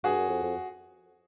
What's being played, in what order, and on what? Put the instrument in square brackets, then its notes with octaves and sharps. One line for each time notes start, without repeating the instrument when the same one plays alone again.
[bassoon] G2 [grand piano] F#4 G#4
[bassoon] F#2
F2
F2